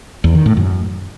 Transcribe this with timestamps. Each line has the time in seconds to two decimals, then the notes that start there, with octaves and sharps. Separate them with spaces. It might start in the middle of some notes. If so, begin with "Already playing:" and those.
0.24 E2
0.35 D#3
0.46 A2
0.57 F#2